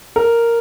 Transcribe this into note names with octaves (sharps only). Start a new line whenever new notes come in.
A#4